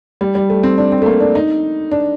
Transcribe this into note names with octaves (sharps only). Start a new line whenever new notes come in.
G3
G3
A3
C4
D4
C4
A3
A#3
D4
D#4
D4